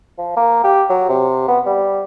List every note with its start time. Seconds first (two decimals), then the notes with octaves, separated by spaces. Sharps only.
0.18 F3
0.37 A#3
0.64 G4
0.90 F#3
1.09 C3
1.48 B3
1.66 G3